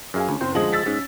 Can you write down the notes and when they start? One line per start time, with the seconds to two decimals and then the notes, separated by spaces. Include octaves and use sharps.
0.14 F#2 G#4 F5 G#5
0.29 D2 C#4
0.41 F#1 C4 C5 C6
0.55 D2 F3 G#3 G#4 A#6 F#7
0.72 E6 A6 B6
0.86 G#2 C#4